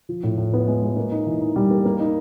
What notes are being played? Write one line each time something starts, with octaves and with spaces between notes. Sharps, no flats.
F3
A2
A2
B3
G#3
G#3
A#3
D#4
E3
D#4
G3
A#3
A#3
D#4